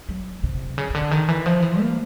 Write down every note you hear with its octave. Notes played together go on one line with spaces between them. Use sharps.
F#3
C3
C#3
C#3
D3
D#3
E3
F3
E3
A#3